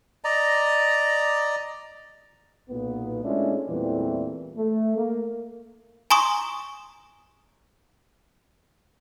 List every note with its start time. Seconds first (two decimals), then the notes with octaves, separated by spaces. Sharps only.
0.24 D5 D#5 A#5
2.69 B1 A#2 B3
3.23 G#3 A3 C#4 D4 E4 F4
3.68 E2 A#2 E3 G3 A3 C4
4.56 A3
4.96 A#3
6.10 G#5 A#5 C6 C#6 D#6